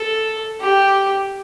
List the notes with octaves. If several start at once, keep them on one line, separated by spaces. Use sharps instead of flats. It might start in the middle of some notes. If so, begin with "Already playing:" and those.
Already playing: A4
G4